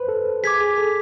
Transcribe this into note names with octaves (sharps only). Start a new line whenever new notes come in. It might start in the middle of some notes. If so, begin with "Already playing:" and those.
Already playing: B4 C5
A4
G#4 D6 G#6 B6
G#4
A4